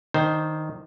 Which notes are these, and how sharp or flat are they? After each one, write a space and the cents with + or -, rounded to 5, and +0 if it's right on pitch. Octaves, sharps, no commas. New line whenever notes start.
D#3 +0 D4 +25 C5 +0